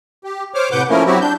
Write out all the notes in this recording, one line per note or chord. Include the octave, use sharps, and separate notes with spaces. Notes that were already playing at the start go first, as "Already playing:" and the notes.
G4
C5 C#5 D6 F6
A2 C3 B4 F#5 D6 G6
F3 A3 A#3 C#4 E4 A#4
F#3 C4 E4 F#4 G4
D4 G6